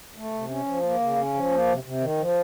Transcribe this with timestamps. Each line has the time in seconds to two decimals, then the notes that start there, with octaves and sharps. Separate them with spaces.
0.16 A3
0.32 C3
0.50 C#4
0.67 F3
0.83 A#3
1.00 C#3
1.16 C#4
1.34 F3
1.51 A#3
1.67 C3
1.84 C3
2.00 D#3
2.18 F3